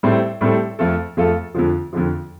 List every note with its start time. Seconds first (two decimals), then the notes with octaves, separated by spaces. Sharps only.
0.03 A2 G3 C4 A4 C5
0.41 A2 G3 C4 A4 C5
0.79 F2 F3 A3 F4 A4
1.17 F2 F3 A3 F4 A4
1.54 F2 D3 F3
1.93 F2 D3 F3